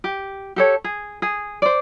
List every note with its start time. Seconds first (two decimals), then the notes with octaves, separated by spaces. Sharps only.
0.04 G4
0.56 G4 A4 C#5
0.84 G#4
1.22 G#4
1.62 C5 D5